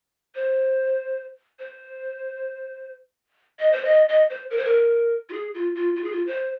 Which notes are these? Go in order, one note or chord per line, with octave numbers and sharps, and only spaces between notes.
C5
C5
D#5
C5
D#5
D#5
C5
A#4
C5
A#4
F4
G#4
F4
F4
F4
G#4
F4
C5